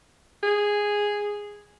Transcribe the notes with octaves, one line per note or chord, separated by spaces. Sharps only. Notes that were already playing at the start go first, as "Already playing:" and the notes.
G#4